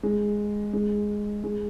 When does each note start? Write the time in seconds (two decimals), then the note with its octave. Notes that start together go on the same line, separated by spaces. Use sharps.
0.03 G#3
0.73 G#3
1.44 G#3